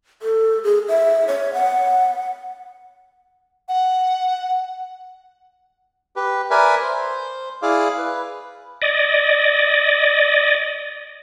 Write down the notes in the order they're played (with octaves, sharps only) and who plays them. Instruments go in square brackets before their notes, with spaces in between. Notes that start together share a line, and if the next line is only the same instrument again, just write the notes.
[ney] A4
G#4
E5
C#5
F#5
[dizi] F#5
[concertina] G4 B4
A#4 B4 D5 E5 G#5
C5
E4 G#4 D5 F5 D6
B4
[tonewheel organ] D5 D#5